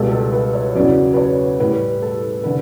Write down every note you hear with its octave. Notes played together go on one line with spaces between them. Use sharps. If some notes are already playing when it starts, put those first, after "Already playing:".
Already playing: C#2 B2 G3 A4
A4
B4
C#5
E2 C#3 F#3 D5
B4
C#5
A2 G3 B4
A4
D3 B4